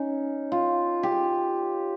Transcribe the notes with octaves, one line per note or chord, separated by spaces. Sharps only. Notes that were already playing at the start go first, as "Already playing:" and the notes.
Already playing: C#4 D#4
F4
G4